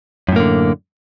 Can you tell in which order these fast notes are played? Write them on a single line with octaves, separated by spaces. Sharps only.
F#2 A2 A#3 D3